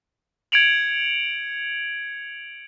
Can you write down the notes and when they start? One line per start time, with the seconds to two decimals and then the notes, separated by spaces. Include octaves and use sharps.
0.52 G#6 C#7 D7 F7 F#7